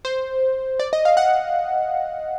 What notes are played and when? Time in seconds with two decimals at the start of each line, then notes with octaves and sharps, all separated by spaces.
0.05 C5
0.79 D5
0.93 D#5
1.05 F5
1.17 F#5